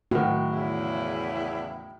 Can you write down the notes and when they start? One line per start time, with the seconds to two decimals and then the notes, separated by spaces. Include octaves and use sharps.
0.11 A2 D#3 F#4
0.51 E2 C#3 E4